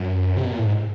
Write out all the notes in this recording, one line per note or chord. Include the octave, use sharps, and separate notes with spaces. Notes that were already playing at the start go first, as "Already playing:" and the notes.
Already playing: F#2
C3
B2
A#2
A2
G#2